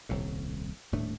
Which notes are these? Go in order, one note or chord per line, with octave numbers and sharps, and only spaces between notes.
D#1 C2 A2
D#1 A2 A3 D4